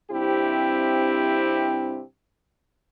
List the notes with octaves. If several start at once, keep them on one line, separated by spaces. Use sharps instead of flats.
G2 C3 C4 E4 G4